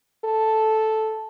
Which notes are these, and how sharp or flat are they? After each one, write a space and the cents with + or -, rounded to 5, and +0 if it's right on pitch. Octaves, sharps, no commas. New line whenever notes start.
A4 -5